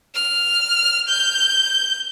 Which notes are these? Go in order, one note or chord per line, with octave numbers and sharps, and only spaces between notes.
F6
G6